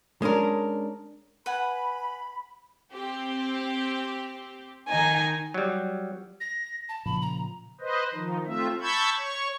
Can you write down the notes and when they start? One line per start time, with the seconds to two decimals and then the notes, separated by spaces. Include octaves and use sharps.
0.22 G#3 C#4 D4 A#4
1.46 B4 F#5 G#5 B5
2.92 C4 G4
4.89 D#3 D#4 G#5
5.54 F#3 G3
6.41 A#6
6.89 A5
7.06 A#2 C#3 F3 B5
7.22 A#5
7.80 B4 C5 D#5
8.14 D#3 F3 D#4
8.45 A3 C4 F4 E5
8.82 A5 B5 C#6 E6 G6 G#6
9.18 C#5 C#6